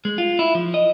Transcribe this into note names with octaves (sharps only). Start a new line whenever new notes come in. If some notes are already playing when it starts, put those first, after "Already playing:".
G#3
F4
E4
F3
D#5